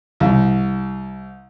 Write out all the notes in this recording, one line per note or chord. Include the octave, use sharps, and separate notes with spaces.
C2